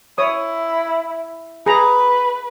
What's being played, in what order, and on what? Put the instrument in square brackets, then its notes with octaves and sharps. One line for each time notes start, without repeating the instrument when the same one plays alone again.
[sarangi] E4 [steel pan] C#5 D#6
[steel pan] G#4 A#5 [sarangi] B4